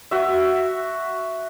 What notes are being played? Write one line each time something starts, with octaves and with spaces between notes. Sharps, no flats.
F#4 E5